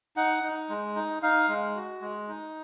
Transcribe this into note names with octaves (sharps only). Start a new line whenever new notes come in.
D#4 F#5
D#4
G#3
D#4
D#4 F5
G#3
F#4
G#3
D#4